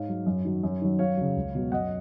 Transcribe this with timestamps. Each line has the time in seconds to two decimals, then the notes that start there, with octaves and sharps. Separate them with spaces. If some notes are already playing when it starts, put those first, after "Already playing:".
Already playing: G#2 C#5 F5
0.09 F#3
0.26 F#2
0.44 D#3 F#3
0.63 F#2
0.82 D#3 F#3
0.99 F#2 C#5 F5
1.17 C#3 F#3
1.37 C#2
1.55 B2 F#3
1.72 F#2 D#5 F#5